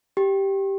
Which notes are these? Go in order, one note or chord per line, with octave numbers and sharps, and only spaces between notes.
G4